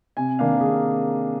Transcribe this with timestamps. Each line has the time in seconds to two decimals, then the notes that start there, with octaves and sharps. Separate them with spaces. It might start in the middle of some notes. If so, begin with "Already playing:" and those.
0.17 C3 G#5
0.39 D#3 A#3 D4 F5
0.54 A#4
0.61 C3 G#4